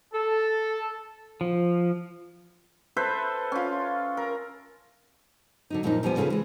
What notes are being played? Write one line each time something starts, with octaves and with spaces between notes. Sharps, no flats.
A4
F3
A4 B4 C5 E5
C#4 F4
A#4
D3 F#3 D#4
F#2 A#2 F3 A#3 B3 D#4
E2 F3 G3 B3 G#5
C#3 F4 G#4 A4 B4
E3 G#3